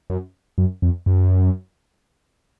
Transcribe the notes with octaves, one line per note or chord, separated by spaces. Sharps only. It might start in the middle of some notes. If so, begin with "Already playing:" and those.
F#2
F#2
F2
F#2